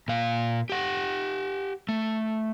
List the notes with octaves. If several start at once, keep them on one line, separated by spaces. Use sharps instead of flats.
A#2 F5
G4 F#5
A3